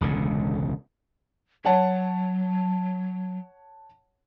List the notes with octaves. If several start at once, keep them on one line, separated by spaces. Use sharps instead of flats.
E1 C#2 D3
F#3 C#5 F#5 A5